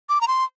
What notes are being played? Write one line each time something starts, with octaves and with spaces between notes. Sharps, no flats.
D6
A#5
C6